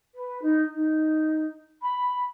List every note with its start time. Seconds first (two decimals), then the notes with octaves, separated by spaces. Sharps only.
0.14 B4
0.41 D#4
0.73 D#4
1.81 B5